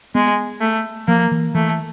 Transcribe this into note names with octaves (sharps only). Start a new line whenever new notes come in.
G#3 B3
A3
F3 A#3
E3
E3 A3